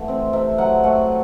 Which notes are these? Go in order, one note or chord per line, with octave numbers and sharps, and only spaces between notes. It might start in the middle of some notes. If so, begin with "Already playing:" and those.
Already playing: E3 A3 F#5
C4
C3 E5
F#3 F#5
A3 F#5